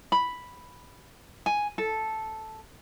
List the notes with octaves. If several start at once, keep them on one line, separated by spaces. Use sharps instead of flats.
B5
G#5
A4